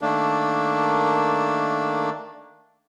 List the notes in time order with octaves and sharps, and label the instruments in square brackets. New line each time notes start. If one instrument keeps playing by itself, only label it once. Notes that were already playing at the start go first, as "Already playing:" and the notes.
[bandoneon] D#3 A3 A#3 D4